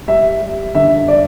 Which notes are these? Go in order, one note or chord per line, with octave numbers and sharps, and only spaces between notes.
G3 E5
G3
D3 E5
D5